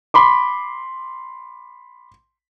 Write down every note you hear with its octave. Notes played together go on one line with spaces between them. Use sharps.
B5 C6 D6